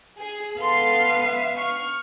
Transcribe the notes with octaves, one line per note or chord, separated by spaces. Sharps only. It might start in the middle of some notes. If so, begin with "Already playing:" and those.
G#4
B3 A4 F5 C6
E5
C#6 F6